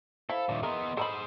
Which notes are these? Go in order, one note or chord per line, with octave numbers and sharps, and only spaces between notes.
E4 A4 C5 F5 B5
D#2 A#2 D4 E5
B3 G#4 A#4 D#5 C6
G#4 A4 C5 A#5 B5